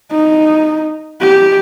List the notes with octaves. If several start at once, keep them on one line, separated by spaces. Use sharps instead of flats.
D#4
G4